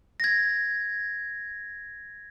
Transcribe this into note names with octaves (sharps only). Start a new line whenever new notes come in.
G#6 A#6